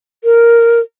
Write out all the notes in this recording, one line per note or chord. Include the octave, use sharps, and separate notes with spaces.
A#4